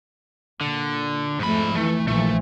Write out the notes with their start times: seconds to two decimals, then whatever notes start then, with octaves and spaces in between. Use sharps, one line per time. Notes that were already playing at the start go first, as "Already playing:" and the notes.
0.61 A#2 D3
1.39 F2 G#2 A3 B5
1.76 E3 A3
2.08 A#1 E3 F3 A3